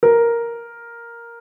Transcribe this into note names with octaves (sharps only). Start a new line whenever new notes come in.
A#4